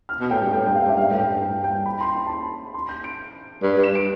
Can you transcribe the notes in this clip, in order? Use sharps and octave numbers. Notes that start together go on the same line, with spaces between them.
F6
B2
A2 G5
G2
A2 G5
G2 G5
F5
G2
E5
G2 F5
A2
G5
G2
G5
G5
B5
C6
B5
A5
B5
C6
G6
D7
G2
G2
E7
D7